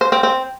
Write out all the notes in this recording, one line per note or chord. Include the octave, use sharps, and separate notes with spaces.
C5
C4
C4